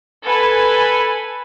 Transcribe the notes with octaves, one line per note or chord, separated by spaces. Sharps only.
A4 B4 G#5 B5